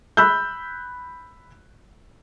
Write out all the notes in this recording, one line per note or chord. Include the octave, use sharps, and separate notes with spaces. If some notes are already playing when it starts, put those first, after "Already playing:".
B5 E6 F#6 G6